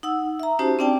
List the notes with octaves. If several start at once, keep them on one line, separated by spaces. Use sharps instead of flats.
D#4 F#5 E6
E5 A#5
C#4 D#4 F#4 G4 C5 A5
C4 D4 D5 G5 A5